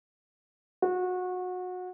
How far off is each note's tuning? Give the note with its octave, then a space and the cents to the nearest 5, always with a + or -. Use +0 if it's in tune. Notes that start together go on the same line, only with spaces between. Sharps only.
F#4 -25